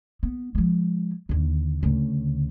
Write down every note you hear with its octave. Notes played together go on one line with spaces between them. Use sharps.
B3
F3 G#3
D#2 D3
D2 C#3